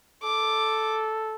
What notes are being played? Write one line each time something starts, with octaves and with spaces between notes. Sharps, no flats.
A4 D6